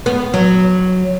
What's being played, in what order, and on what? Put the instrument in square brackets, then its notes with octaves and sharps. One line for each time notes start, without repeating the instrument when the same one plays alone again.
[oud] B3
F#3